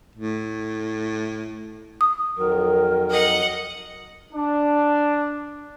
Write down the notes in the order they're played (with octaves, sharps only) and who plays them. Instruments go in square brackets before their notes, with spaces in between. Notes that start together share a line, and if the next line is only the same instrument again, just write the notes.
[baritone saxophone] A2
[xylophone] D#6
[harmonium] F2 D#3 F#3 [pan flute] A#4
[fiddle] D#5 F#5
[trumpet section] D4